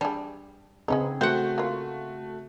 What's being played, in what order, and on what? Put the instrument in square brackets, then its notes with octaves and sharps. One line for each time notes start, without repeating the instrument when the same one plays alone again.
[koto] G3 [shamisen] D4 G#4
[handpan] C#3 C4 G#4 [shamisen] G#3 B3 D#4
[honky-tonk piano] A3 F#4 [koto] C5 F#5 [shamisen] G5
[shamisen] A#3 F4